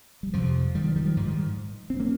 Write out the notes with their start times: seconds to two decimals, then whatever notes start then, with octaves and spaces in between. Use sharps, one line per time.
0.23 G3
0.33 F2 C3 F3
0.75 D#3 G3
0.86 F3
0.96 D#3 G3
1.06 F3
1.17 G#2 F3
1.27 D#3 G3
1.90 C4
2.00 A#3 C#4